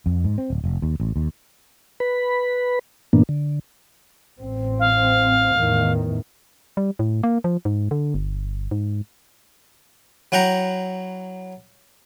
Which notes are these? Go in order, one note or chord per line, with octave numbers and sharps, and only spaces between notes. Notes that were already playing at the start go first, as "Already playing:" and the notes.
F2
G#2
C4
D1
F1
D#2
A1
D#2
B4 B5
G2 A#2 E3 A#3 B3 D4
D3
A1 C4
F5
E2 A2 D#3
G3
A2
A#3
F3
G#2
D3
G1
G#2
F#3 E4 F#5 G5 A#5